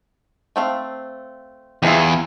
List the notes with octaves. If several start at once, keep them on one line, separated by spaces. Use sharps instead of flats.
A3 C4 F5
E2 G3 E4 F4